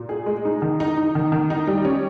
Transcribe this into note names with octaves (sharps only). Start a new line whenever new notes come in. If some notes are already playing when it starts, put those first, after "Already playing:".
Already playing: A#2
G#4
G#3
D#4
D#3
D#4
D#4
D#3
D#3
D#4
G3
C#4